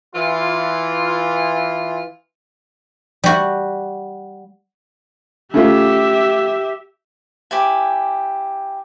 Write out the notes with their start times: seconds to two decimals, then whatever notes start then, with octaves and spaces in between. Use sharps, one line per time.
0.14 E3 F4
3.24 G3 F#4
5.54 C#3 A3 F4 G4 E5
7.51 E4 G4 G#5 D6